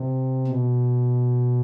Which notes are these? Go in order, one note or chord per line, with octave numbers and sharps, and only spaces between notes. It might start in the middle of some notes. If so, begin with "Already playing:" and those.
Already playing: C3
B2